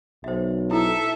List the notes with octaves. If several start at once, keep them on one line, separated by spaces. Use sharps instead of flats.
B1 C5 E5
E4 A4 E5